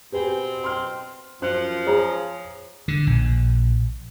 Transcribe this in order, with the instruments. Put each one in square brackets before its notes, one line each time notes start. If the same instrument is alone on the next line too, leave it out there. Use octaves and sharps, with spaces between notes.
[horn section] B2 C4 [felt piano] G4 B4 G#5
[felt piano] C6 F6
[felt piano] F#2 C5 F#6 [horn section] F3
[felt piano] G#4 C#5 A#5
[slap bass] D3
A#1